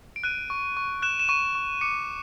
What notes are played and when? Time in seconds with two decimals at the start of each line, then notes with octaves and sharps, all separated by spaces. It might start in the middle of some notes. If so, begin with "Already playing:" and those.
0.16 D7
0.24 F#6 D#7
0.50 C#6
0.77 C#6
1.02 F#6 E7
1.19 E7
1.29 C#6 D#7
1.55 C#6
1.81 D6 C#7